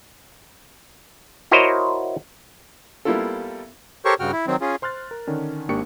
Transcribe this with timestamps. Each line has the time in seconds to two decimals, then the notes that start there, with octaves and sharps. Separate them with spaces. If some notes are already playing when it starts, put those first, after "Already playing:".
1.51 E4 F#4 A#4 C5 C#5 D#5
3.05 G3 A#3 B3 E4 F4 A4
4.05 G4 A4 A#4 C5 C#5 C#6
4.20 G2 C#3 F#4 G5 F6
4.33 E4
4.47 D#3 F#3 C4
4.61 C#4 F4 G#4
4.82 C5 C6 F6 F#6 A6
5.11 A#4
5.27 D3 D#3 C#4 D4
5.69 G#1 A#3 D4 G4 C#6 C#7